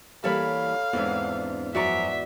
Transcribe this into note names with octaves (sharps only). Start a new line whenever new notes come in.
E3 G3 A#3 A4 C#5 F5 B5
E2 G#2 C4 D4
F#2 F3 F#4 D5 E5 A#5 C#6